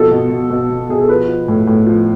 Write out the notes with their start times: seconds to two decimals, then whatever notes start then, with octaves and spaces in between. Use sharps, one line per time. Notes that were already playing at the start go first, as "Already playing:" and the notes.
Already playing: B2 F3 A4
0.11 B2
0.30 B2
0.50 B2
0.70 B2
0.89 B2 G#4
1.00 A4
1.08 F3 B4
1.28 F3
1.48 A2
1.67 A2
1.86 F3